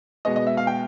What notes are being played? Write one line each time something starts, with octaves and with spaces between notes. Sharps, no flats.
B2 G#3 B3 D#5
D#5
E5
F5
G5